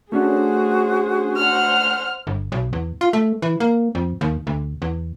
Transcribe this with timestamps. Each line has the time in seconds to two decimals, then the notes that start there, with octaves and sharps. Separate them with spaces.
0.12 A3 C#4 D4 F#4 G#4 C5
1.37 C5 F#5 F6
2.27 G1
2.52 B1
2.73 E2
3.01 F4
3.13 A3
3.42 E3
3.60 A#3
3.95 F2
4.21 D#2
4.47 D2
4.82 E2